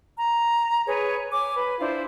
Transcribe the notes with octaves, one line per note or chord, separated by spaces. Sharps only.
A#5
G#4 B4 C#5
C#5 G#5 D6
B4
D4 E4 F4 C5